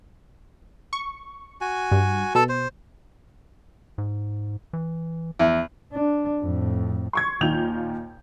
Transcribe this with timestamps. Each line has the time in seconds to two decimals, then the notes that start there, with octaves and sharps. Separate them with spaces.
0.93 C#6
1.61 F#4 G#5
1.92 G2
2.35 B2 A4 A5
2.49 C5
3.98 G#2
4.73 E3
5.39 E2
5.93 D4
6.42 F2 A2
7.13 C6 C#6 G#6
7.41 D#2 A#2 D#3 F4 G6 F7